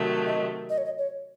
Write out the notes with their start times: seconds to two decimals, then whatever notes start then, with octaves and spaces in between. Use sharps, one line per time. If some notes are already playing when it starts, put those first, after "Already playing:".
Already playing: C3 D#3 F#3 A3
0.27 D#5
0.70 D#5
0.78 C#5
0.85 D#5
0.98 C#5